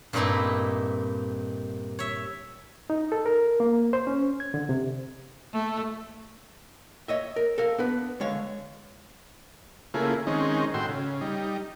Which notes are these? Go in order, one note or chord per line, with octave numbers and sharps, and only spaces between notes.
G2 A#2 A3 C4 D#4 E4
C#5 E5
D#4
A4
A#4
A#3
C5
C#4
G#6
D3
C3
A3
C#5 D#5 E5
A#4
A4 A#4 F5
B3 D4 B4
D3 G#3 C#5 F5
C#3 A3 A#3 E4 F4 G#4
D#3 G#3 C4 C#4 D#4
A2 F#4 G5 C6 E6
C#3
G3 D#4